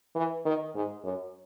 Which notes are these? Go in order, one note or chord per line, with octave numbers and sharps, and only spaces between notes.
E3
D#3
G#2
F#2